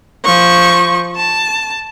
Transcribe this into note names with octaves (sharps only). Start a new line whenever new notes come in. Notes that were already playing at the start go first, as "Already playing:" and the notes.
F3 C#6
A5